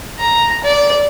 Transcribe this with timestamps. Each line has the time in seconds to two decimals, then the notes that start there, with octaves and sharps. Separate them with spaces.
0.20 A#5
0.64 D5